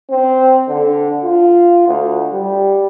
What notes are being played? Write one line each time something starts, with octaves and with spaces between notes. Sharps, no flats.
C4
D3
F4
D2
G3